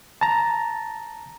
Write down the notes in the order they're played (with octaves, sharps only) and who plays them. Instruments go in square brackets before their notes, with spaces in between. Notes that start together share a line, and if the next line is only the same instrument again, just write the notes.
[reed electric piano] A5 A#5